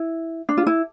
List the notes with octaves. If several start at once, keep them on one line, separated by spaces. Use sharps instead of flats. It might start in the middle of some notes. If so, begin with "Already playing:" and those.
Already playing: E4
D4
F4
E4